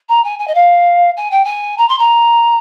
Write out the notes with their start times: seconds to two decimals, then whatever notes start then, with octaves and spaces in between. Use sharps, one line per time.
0.09 A#5
0.24 G#5
0.39 G#5
0.47 D#5
0.55 F5
1.17 G#5
1.31 G5
1.44 G#5
1.78 A#5
1.89 C6
1.99 A#5